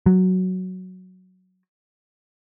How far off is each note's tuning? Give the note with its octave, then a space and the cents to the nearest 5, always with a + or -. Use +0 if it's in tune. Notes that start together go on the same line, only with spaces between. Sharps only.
F#3 +0